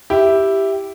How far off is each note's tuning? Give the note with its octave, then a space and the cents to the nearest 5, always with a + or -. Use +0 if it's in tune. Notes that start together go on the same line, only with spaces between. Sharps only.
E4 +0 G4 +0